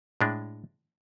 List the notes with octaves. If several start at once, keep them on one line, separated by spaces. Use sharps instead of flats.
A2 G#3 D4